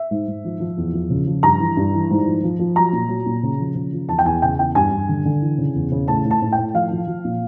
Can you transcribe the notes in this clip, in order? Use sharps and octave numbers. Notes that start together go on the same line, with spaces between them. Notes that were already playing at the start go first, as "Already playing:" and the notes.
Already playing: E5
G#2
G#2
F3
F3
E2
F3
C#3
F3
G2 A#5
E3
G2
E3
G#2
F3
F3
F3
F#3 A#5
A#2
F#3
A#2
C#3
F3
C#3
F3
E2 A5
G5
E2 G#5
C#3 G5
E2 G5
G2 G#5
G2
D3
D3
E3
C#3
E2
C#3
A2 A5
A2
A5
A2
G5
A2
F3 F5
F3
F3
A#2